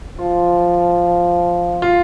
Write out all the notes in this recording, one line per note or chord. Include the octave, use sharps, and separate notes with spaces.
F3 F4
F4